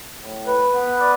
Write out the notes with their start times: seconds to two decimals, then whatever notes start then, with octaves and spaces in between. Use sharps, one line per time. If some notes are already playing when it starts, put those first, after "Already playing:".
0.19 A2
0.47 B4
0.73 B3
1.00 D5